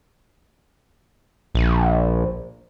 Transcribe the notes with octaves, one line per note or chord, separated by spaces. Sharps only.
A#1